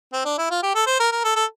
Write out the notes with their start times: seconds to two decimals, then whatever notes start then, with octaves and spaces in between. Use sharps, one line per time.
0.13 C4
0.25 D4
0.38 E4
0.51 F4
0.63 G4
0.75 A4
0.87 C5
1.00 A#4
1.12 A#4
1.24 A4
1.36 A4